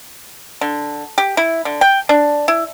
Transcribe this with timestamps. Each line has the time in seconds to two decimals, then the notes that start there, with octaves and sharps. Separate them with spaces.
0.61 D3
1.18 G4
1.37 E4
1.65 D3
1.81 G5
2.09 D4
2.48 E4